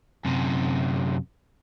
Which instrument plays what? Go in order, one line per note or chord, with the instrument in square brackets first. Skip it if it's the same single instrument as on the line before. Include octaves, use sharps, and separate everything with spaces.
[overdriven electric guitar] F#2 C3